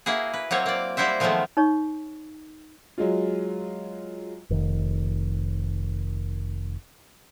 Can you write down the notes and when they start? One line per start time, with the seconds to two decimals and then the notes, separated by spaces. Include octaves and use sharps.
0.06 A#3 E4 F#4 G#4
0.34 B4
0.51 F#3 A#3 C4 C#5
0.66 A#3 D5
0.97 G3 E4 F#4 C5 E5
1.20 D#3 F3 F#3 G#3 A3 B3
1.57 D#4 C#5 C#6
2.98 F#3 G#3 F4
4.50 F1 D#3